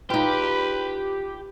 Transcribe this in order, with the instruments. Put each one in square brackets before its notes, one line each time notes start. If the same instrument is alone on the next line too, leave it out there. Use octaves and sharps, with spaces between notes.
[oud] D#4 F4 [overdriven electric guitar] G4 [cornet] B4